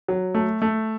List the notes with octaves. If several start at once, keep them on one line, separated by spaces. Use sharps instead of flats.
F#3
A3
A3